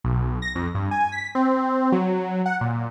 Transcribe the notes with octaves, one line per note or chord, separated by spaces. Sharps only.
B1
A#6
F2
G2
G#5
B6
C4
F#3
F#5
A#2